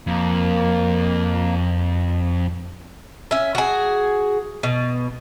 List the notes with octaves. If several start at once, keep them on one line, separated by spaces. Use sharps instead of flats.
F2 A#3
C#4 E5
F#4 G#4
B2